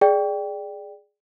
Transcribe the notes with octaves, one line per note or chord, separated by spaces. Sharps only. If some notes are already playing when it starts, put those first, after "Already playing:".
G#4 D5 G5